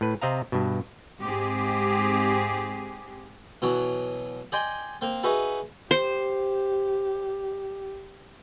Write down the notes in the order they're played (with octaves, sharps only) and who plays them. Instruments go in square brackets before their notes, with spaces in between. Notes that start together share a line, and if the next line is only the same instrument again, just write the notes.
[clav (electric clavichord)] A2 B4
C3 C4 D#5 F5 A#5
G2 B2
[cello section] G#2 C4 G4 G#4
[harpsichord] B2 E3 F#3
D5 D#5 G5 G#5 C6
A#3 C4
D#4 F#4 G#4 B4 E5
[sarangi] G4 [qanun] C5